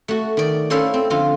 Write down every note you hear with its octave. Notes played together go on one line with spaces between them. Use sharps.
A3 F#4
D#3 D5
C#4 E4 A4 C5 E5 F5
C4
D3 F3 F4